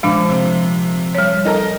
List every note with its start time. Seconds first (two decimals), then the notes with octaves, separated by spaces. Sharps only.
0.03 A#2 F3 G#3 D4 D6
0.29 C3
1.15 G3 C#5
1.45 D#4 A4 A#4